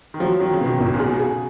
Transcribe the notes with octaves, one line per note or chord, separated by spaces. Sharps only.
D#3
F3 F#3
D#3 F#3
C#3
B2
D#3
B1
A#2
B2 G#4
B2
C#3 G#4